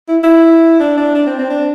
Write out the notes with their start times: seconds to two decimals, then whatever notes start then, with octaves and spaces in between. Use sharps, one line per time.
0.08 E4
0.23 E4
0.80 D4
0.97 D4
1.15 D4
1.27 C4
1.38 C4
1.50 D4